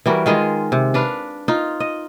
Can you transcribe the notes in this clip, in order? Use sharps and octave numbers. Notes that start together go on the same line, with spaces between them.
E3 G3 F#4 A#4
D#3 G#3 F4 G#4
C3
D4 B4 F5
D#4 F4
D#5